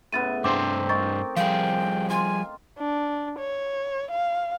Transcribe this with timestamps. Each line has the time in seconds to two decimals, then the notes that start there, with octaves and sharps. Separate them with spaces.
0.12 A2 C#3 B3 A6 D#7
0.44 G2 C4 D4 C5 D6
0.89 D#4 A#4 C#6 D6 A6
1.36 F3 G3 G#4 F5 G5
2.10 F4 G#5
2.78 D4
3.39 C#5
4.11 F5